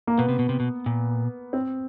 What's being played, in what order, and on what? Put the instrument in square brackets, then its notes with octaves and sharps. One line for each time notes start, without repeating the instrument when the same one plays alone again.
[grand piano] A#3
[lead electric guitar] B2 [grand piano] B3
[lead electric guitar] C3
B2
C3
B2
A#2
[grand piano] C4